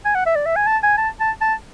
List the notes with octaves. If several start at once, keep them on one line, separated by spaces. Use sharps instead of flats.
G#5
F#5
E5
D5
E5
G#5
A5
G#5
A5
A5
A5